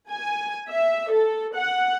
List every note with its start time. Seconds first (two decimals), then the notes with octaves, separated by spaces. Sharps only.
0.11 G#5
0.69 E5
1.12 A4
1.55 F#5